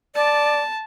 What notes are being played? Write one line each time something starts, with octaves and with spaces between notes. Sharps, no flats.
D5 A5